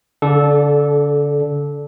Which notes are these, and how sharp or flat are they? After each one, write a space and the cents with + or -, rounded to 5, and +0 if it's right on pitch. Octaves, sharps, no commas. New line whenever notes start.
D3 -40 A4 -15 D5 +0